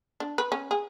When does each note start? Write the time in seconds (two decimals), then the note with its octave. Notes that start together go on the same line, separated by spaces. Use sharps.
0.20 D4
0.38 B4
0.52 C#4
0.71 G#4